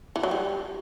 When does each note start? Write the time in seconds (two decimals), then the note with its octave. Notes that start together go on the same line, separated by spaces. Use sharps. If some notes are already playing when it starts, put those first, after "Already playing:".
0.16 E3
0.23 F#3
0.31 G3